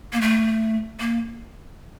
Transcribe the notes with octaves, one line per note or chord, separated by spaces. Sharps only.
A#3
A3
A#3